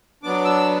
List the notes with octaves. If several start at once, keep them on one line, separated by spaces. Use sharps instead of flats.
F#3 B3 D4 D6
E6